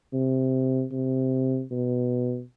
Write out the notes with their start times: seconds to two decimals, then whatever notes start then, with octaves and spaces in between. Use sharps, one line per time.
0.13 C3
0.92 C3
1.71 B2